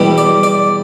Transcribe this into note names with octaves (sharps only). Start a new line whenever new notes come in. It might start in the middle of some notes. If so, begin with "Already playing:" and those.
Already playing: E2 B2 G3
D5
D5